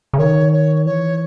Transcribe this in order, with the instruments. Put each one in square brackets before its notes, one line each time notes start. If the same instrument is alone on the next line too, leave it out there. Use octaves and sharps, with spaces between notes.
[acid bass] C#3
[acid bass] D#3 [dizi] C#5
[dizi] C#5
[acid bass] E3 [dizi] C#5